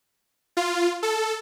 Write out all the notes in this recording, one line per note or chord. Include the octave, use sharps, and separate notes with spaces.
F4
A4